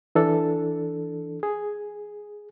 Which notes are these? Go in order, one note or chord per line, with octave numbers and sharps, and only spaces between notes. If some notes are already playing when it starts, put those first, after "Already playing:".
E3 D4 A4
G#4